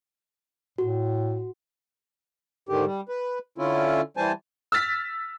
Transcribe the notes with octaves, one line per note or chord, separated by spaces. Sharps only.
A2 F#4
G#2 D3 D#3 G4
G3
B4
D3 C#4 E4 F4
E3 G3 C5 G#5 A5
E6 F6 A6 B6